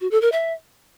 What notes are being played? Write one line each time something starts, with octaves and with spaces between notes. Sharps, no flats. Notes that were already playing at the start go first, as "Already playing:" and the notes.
F#4
A4
A#4
E5